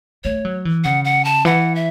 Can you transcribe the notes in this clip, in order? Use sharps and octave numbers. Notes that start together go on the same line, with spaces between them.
A3 C#5
F#3
E3
C#3 F#5
F#5
A5
E3 F#5
E5